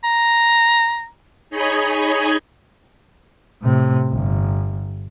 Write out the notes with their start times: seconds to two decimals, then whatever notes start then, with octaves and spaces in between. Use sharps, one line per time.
0.04 A#5
1.50 D#4 G#4 C#5 D#5 G#5 B5
3.62 A2 C3
4.12 G1